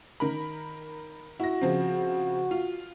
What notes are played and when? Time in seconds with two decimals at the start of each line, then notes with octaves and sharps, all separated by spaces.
0.20 D#3 A#4 B5
1.40 E4 F#4 A#6
1.61 C#3 F3 C4
2.51 F4